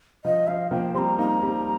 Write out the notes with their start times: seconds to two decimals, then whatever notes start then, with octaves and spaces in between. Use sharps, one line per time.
0.25 F3 D#5
0.48 F3 F5
0.71 F3 A#3 G5
0.95 G3 C4 A#5 C6
1.18 A#3 D#4 A#5
1.42 G3 C4